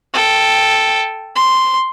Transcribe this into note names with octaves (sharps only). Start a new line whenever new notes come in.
A4 G5
C6